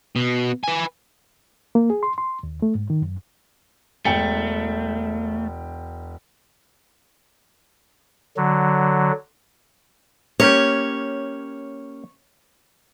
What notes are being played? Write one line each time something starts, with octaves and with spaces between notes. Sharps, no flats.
B2
B4 G#5
A#3
G#4
C6
C6
D#2
A3
G#2
D#3
F#2
E1 A3 G5 C#7
D3 F#3
A#3 C#4 G4 C#5